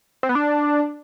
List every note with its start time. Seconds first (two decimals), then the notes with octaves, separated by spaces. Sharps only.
0.23 C4
0.29 B3
0.35 D4